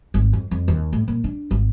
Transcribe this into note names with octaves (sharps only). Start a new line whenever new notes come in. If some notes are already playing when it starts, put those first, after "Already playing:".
G#1
F2
F2
D#2
A2
A#2
D4
G#1